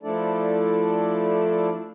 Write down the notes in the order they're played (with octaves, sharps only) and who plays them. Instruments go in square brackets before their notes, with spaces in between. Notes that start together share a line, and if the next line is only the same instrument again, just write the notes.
[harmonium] F3 A3 D4 E4 A4 D5